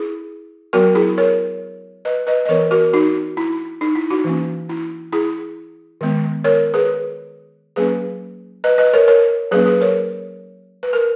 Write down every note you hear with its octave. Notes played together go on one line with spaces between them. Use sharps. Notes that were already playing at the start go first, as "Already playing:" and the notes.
Already playing: E4 G#4
F#3 B3 F#4 A#4
E4 G#4
A#4 C#5
B4 D#5
B4 D#5
D#5
E3 B3 A#4 C#5
F#4 A#4
D#4 F#4
E4
D#4
E4
D#4 F#4
E3 A#3 C#4
E4
E4 G#4
D#3 G#3 B3
A#4 C#5
G#4 B4
F#3 A#3 C#4 G#4 B4
B4 D#5
B4 D#5
A#4 C#5
A#4 C#5
F#3 A#3 C#4 G#4 B4
G#4 B4
A#4 C#5
B4
A#4